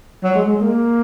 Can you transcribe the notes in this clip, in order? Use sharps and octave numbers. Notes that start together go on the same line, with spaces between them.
F#3
G#3
G#3
A#3